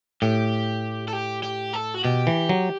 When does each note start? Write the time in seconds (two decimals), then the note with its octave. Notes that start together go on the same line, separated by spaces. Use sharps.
0.22 A2 G4
1.08 A4
1.13 G4
1.43 G4
1.74 A4
1.95 F#4
2.04 B2 G4
2.27 E3
2.49 F#3